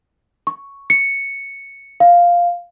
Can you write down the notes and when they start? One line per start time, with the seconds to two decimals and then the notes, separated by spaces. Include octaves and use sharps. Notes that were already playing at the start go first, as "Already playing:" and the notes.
0.47 C#6
0.90 C#7
2.00 F5